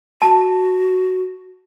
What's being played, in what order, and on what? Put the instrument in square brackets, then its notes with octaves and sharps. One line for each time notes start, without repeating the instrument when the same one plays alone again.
[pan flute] F#4 [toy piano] A5